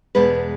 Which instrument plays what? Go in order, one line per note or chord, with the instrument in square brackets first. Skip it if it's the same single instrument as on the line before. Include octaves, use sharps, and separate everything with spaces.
[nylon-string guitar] E2 B2 G#3 B3 B4 D5